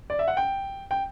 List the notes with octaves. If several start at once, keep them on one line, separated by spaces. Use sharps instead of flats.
D5
E5
F#5
G5
G5